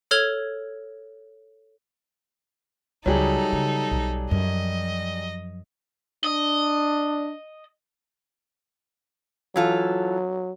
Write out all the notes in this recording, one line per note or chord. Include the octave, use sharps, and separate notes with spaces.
A4 C#5 F6 G#6 F7 G7
C#2 F#3 G3 D#4 G#4 A4
C#3
B1
F#2 F3 D#5
D4 D#5
E3 F#3 F4 A4